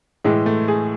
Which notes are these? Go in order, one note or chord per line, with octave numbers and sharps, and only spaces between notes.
A2 E3 G#3
A3
G#4